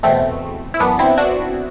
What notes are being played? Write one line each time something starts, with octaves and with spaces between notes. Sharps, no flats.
E2 B2 A3 C4
E4
F#2 E3 B3 D4
C4 E4
D4 F#4